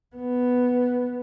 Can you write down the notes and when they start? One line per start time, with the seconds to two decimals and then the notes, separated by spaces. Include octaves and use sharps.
0.16 B3